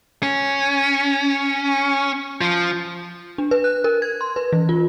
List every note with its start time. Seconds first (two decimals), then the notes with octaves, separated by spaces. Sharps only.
0.23 C#4
2.41 F3
3.38 D4
3.51 B4
3.64 F#6
3.84 A#4
4.02 G#6
4.21 C6
4.36 B4
4.53 E3
4.69 F4